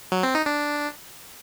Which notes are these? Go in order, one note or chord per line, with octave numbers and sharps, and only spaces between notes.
F#3
C4
D#4
D4